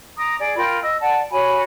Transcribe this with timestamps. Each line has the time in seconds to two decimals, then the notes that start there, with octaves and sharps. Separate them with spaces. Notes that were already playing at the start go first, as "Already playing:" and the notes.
0.17 A#5 D6 D#6
0.39 G#4 D5
0.57 F4 A#4 G5 B5
0.83 D#5 E6
1.00 D5 F#5 A5
1.31 F#4 C#5 G#5 B5